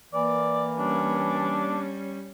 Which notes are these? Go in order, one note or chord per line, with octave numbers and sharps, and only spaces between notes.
E3 A#3 D5
G3 C#4 D4